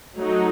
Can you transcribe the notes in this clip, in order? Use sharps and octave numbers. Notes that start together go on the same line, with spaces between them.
F#3 A3 D#4 F#4